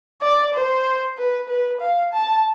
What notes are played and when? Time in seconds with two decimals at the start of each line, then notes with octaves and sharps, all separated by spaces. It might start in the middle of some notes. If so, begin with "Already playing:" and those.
0.22 D5
0.54 C5
1.18 B4
1.49 B4
1.81 F5
2.13 A5